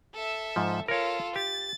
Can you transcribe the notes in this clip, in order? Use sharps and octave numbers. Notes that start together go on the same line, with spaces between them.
A4 E5
G#2 F3
F4 A4 A#4 C#5
G4 A6